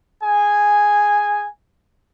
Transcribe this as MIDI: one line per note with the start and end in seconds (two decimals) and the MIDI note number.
0.23 1.45 68
0.23 1.45 80